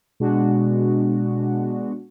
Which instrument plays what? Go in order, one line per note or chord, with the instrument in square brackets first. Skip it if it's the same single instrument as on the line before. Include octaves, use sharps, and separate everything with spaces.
[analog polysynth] B2 G#3 D4 F#4